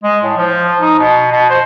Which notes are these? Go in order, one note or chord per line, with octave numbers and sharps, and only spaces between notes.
G#3
A2
F3
D#4
B2
B2
C5